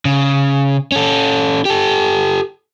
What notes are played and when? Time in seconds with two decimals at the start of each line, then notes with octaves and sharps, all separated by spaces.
0.05 C#3
0.92 C#4 A4
1.65 G4 A4